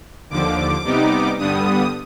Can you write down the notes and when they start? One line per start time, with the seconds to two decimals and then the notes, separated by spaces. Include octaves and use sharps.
0.30 D#2 D3 F3 D6
0.84 C3 G3 B3 D#4
1.38 G2 D3 G3 B3 D#6